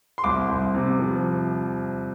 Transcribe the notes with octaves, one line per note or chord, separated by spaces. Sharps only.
C6
C2 D6
C2
C3
F3